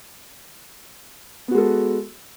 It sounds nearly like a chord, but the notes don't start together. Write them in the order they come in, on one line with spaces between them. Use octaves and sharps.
B3 F#4 G#3 A4